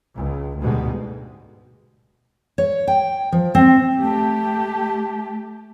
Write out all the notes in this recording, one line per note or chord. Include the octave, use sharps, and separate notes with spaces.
C#2
D2 G#2 B2 G3 G#3
C#5
G5
F3
C4
A3 G4 A5